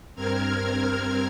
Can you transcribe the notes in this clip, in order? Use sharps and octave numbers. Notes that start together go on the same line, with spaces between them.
G2 C4 A#4 F6 G#6